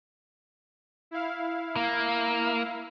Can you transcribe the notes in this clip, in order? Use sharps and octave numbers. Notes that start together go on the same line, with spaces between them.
E4 F5
A#3